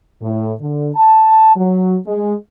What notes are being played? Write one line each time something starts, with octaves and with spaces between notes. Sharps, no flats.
A2
D3
A5
F#3
G#3